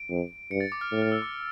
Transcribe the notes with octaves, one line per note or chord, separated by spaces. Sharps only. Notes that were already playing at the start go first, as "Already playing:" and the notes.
Already playing: D7
F2
G2 C#7
A6
D6
F6
A2
F6
E6
D6